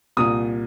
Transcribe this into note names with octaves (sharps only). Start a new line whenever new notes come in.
C2 A#2 D#6